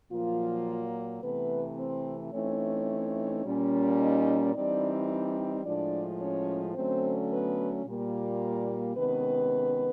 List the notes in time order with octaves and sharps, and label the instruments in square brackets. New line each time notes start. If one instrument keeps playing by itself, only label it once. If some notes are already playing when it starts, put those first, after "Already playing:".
[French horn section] A#2 F3 F#3 A#3 F4
C3 E3 A3 B3 B4
C4 C5
E3 A3 C4 C#4 D#4 C#5
A#2 G3 A#3 C#4
D#4 D#5
E3 G3 C4 D4 D#4 D5
D4 D5
A2 F3 G#3 D4 D5
C#4 C#5
D3 F#3 A3 C4 C#4 C5
B3 B4
A#2 G3 A#3
C3 D#3 G#3 B3 C#4 B4